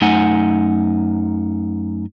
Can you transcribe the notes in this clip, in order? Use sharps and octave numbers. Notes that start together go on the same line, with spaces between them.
F#2 A3 D#4 F#5 G#5